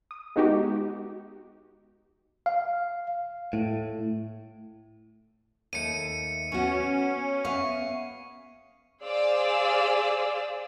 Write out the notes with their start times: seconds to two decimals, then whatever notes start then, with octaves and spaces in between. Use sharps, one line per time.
0.11 D#6
0.36 G#3 B3 D#4 F#4 G4
2.46 F5
3.53 A2
5.73 D#2 A3 C#7 D#7
6.52 B3 C#4 F#4
7.45 B3 E5 F5 C#6
9.03 G#4 C5 D5 F5 E6